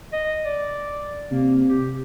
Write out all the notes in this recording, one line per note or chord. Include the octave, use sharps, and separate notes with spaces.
D#5
D5
C3 A#3
G4